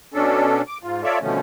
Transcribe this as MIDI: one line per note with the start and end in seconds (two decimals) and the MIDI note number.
0.14 0.62 47
0.14 0.62 61
0.14 0.62 62
0.14 0.62 69
0.68 0.78 86
0.83 1.03 44
0.83 1.03 65
1.04 1.19 65
1.04 1.19 69
1.04 1.19 73
1.04 1.19 74
1.04 1.19 76
1.22 1.40 47
1.22 1.40 50
1.22 1.40 51
1.22 1.40 53
1.22 1.40 57
1.22 1.40 61